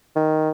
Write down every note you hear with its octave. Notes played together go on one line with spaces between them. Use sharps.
D#3